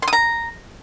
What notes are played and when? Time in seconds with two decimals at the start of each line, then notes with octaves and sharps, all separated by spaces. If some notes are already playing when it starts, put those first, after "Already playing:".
0.02 C6
0.08 D#6
0.13 A#5